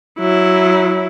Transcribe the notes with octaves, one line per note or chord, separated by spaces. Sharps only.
F#3 E4